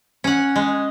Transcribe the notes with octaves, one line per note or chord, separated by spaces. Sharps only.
C#4 F#5
G#3